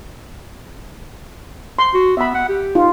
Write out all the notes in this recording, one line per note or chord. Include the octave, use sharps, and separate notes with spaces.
C6
F#4
B3 E5 B5
F#5
G4
D#4 F4